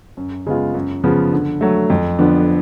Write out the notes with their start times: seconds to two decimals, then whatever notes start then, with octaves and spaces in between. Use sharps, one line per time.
0.17 F#2
0.46 C#3 G#3 B3 F4
0.74 F#2
1.04 C#3 F3 B3
1.32 D3
1.61 F#3 A3
1.90 F2
2.19 D3 F3 B3 D4